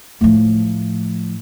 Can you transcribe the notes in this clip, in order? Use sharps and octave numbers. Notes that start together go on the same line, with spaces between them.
A2 F3